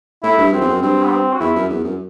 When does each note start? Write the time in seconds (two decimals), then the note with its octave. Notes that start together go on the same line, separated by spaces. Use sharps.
0.23 A2 E4
0.38 G2
0.53 F#2 C4
0.61 E2
0.68 F#2
0.82 G2 C4
1.03 B3
1.12 C4
1.33 F#4
1.40 E2 E4
1.55 F#2
1.70 E2
1.84 F#2